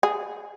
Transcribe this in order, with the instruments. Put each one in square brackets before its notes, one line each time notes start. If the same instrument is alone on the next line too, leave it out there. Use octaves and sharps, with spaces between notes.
[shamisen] G#4